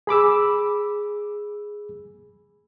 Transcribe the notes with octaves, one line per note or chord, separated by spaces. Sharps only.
G#4 B5 D6 E6